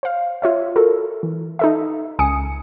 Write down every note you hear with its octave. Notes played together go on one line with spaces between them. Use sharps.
C5 F5
F4 C#5 E5
F#4 A4 A#4
E3
D#4 A4 E5
C#2 G#5 D#6 C#7